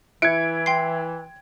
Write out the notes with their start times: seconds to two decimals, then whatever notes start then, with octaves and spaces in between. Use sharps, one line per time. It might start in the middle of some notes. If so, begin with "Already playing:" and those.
0.22 E3 E4 F#6 G#6 C#7 D7
0.66 G5 C6 C7